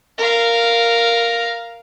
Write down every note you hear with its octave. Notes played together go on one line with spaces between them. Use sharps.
A#4 F5